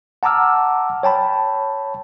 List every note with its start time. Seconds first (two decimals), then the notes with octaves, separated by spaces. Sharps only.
0.23 F#5 A5 A#5 D6 E6 F6
1.03 C#5 G5 A5 B5